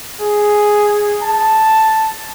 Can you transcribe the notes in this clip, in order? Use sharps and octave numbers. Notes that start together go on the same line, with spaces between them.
G#4
A5